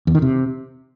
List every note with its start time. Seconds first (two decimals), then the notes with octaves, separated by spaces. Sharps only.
0.07 E2
0.15 D#3
0.22 C3